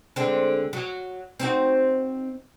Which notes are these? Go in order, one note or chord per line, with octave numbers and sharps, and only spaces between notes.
D3 G#3 C4
F#3
C4 D#4 F#4